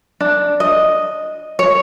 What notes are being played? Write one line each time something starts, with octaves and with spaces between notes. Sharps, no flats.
D4
D#5
C#5